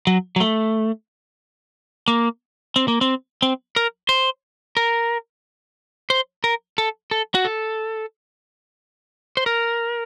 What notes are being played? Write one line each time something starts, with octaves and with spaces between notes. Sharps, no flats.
F#3
F#3
A3
A#3
C4
A#3
C4
C4
A#4
C5
A#4
C5
A#4
A4
A4
F#4
A4
C5
A#4